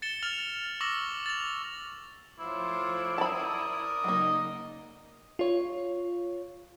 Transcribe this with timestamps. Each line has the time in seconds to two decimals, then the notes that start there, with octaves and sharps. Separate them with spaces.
0.02 A6 C#7 E7 G7
0.23 F6 A6 F7 F#7
0.81 C#6 D6 E6 A#6 E7 F#7
1.26 A6 F7
2.39 F3 A3 E4 F4 C5 C#5 D6
3.18 A#4 D5 A5 B5 D#6
4.04 C#3 F#3 A#3 D#4 D#5
5.39 F4 C#5